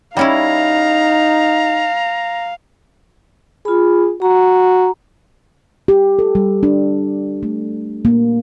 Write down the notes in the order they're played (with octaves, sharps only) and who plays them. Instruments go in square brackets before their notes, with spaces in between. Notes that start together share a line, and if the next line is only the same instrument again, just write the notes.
[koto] G3 C#4 E4 [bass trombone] D#4 [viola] F5 [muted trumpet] A#5
[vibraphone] F4 B5 [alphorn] G#4
[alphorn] F#4 [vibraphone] A#5
[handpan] G4
A4
G3
D4
A3
A#3